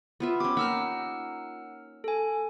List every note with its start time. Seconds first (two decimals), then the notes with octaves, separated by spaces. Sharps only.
0.20 B3 F4 E5
0.40 C#4 G4 D6
0.57 A#3 D#4 F#5 B5 E6 F6
2.04 A4 G#5